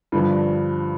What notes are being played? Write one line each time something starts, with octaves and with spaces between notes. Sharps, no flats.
G2 D3 F3